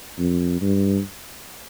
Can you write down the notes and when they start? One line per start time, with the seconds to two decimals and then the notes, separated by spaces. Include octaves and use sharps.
0.18 F2
0.61 G2